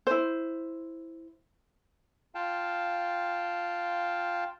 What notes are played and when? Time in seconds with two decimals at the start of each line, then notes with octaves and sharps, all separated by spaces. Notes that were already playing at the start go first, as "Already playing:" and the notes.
0.07 E4 C5
2.35 F4 F5 G5 A5